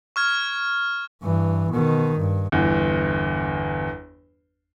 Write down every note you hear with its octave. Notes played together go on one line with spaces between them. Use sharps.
C#6 F6 G#6
G2 E3
B2 D#3
G2
G1 E2